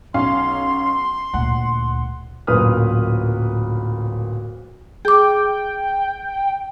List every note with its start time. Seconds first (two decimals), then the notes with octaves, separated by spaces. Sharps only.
0.14 B1 C#4 F5 C6
1.34 D2 A#2 F#5
2.47 D1 F#2 A#2 B4 D#6 F6
5.05 G#4 G5 D6